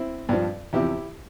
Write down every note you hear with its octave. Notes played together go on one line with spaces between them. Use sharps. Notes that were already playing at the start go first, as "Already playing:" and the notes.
Already playing: C4 E4
G2 F3
E2 C3 F3 E4 G4